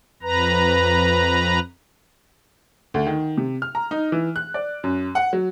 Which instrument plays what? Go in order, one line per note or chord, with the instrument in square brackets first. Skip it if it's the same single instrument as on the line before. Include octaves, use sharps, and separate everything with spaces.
[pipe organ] F2 B4 A#5
[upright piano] D2
D#3
C3
F6
A#5
D#4
E3
F#6
D5
F#2
F#5
F#3